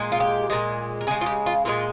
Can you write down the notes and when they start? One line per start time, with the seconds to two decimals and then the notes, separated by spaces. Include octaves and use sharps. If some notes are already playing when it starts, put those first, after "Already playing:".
Already playing: A#2 G#3
0.12 F4
0.20 G4
0.50 A#2 G#3
1.01 A#4
1.07 C#3 G#4
1.11 G#3
1.21 F4
1.26 G4
1.46 F4
1.65 A#2 F3 G#3 F4